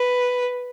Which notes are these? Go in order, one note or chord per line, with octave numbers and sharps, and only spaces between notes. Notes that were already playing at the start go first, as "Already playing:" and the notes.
Already playing: B4